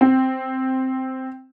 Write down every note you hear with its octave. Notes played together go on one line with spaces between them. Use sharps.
C4